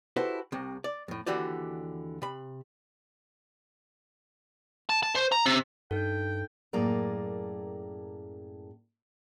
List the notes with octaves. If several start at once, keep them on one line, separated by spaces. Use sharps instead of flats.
E4 F#4 G4 A4 B4 C5
C2 C3
D5
F2 A2
D#2 D3 E3 F#4 G4 D5
C3 B5
A5
A5
C5
A#5
C3
G2 D#4 A4 G5
F#2 A2 A#3 G#4 D5 A#5